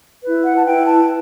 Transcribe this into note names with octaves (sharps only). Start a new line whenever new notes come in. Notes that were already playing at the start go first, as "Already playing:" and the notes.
E4 B4
F#5
A5
E4 B4 G5
A5